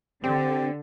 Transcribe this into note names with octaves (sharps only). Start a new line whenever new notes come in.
D3 C4 G4